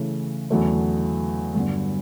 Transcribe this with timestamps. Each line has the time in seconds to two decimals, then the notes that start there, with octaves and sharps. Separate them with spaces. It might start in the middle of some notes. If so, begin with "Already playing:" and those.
Already playing: C#3 E3 A3 E4
0.50 E2 D3 F#3 A3 C#4
1.55 G2 D3 F#3 B3